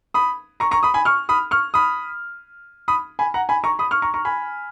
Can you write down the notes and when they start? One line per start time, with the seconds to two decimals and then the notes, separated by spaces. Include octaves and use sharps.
0.14 B5 D#6
0.60 A#5 C#6
0.71 A#5 C#6
0.83 B5 D#6
0.94 G#5 B5
1.05 C#6 F6
1.29 B5 D#6
1.51 C#6 F6
1.74 B5 D#6
2.88 B5 D#6
3.19 G#5 B5
3.34 F#5 A#5
3.49 G#5 B5
3.64 A#5 C#6
3.79 B5 D#6
3.91 C#6 F6
4.02 A#5 C#6
4.14 A#5 C#6
4.25 G#5 B5